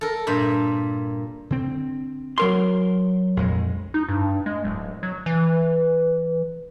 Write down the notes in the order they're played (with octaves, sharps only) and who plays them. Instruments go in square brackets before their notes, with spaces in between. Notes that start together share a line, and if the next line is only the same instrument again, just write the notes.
[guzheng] A4 A#4
G2 A#2 B5
[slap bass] D3 C4
[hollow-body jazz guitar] F#3 A#4 C6
[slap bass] A#1 F2 G#3
[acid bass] D#4
G2
G#3
D1
F#3
E3